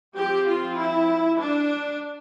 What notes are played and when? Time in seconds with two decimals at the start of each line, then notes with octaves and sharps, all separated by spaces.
0.16 F3 C4 G4
0.46 F4
0.77 E4
1.39 D4